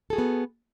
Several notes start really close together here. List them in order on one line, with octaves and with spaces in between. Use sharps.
A4 G#4 F#4 B3